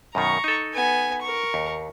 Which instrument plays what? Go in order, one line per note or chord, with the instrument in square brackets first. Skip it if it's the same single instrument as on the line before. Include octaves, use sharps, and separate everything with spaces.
[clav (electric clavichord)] F#2 B2 D#3 [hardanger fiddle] A#5 C#6
[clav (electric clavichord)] D#4 A4
[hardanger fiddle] B3 G#5
A#4 C#6
[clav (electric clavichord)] D#2